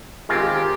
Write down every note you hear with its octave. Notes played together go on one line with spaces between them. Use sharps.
D#3 G#3 C4 F4 G4